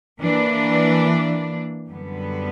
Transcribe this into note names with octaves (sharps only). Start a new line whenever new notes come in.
E3 A#3 D4
F#2 D3 G3 B3